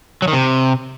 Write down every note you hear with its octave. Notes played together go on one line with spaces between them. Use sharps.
F#3
D#3
C3